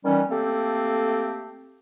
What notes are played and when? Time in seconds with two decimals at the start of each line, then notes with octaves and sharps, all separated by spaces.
0.05 D#3 E3 G3 C#4
0.30 A3 A#3 C4 G4 A4